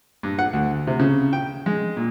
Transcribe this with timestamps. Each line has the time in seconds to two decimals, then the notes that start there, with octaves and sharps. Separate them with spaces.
0.23 G2
0.39 F#5
0.53 D2
0.87 C3
1.00 C#3
1.33 G5
1.66 G#3
1.97 A#2